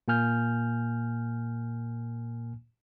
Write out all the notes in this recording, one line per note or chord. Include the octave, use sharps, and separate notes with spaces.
A#2 A#3 G#5 F6 G6